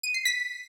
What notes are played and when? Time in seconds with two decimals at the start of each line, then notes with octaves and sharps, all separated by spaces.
0.03 D#7
0.14 C7
0.25 B6